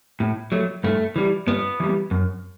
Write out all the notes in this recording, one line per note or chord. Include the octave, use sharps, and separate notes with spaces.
A2
F#3 A3
G2 A3
E3 G3
G2 B3
E3 G3
F#2